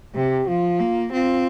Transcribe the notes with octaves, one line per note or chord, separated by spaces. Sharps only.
C3 G4
F3 F4
A#3
C4 F4